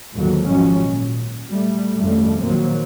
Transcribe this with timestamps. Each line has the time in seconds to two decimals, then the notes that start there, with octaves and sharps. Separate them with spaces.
0.15 D#2 G#2 D3 F3 F#3
0.47 G#1 F3 F#3 G#3 C#4
0.83 A#2
1.48 G3 A3
1.96 G#1 F2 C#3 G3 A3
2.43 A#1 D#3 F#3 A#3 C4